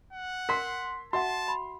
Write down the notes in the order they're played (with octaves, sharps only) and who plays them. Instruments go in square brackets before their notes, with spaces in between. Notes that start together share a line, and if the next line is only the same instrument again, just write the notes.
[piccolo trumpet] F#5
[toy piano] A#4 [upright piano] C6 B6
[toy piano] F#4 E5 F#5 [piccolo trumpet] A5 [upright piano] C6
[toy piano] B5